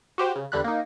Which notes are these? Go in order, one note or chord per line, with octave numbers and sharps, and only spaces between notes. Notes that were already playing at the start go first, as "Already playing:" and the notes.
F#4 G4 C5
C#3
E2 D3 G3 B5 F#6
A#3 D#4